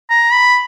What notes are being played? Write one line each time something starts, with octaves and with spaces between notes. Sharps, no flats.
A#5
B5